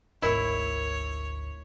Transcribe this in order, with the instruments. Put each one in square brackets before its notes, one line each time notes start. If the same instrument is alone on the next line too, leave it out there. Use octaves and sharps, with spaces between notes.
[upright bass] G#1 D2 [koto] E4 [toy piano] A#4 D#5 [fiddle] C#5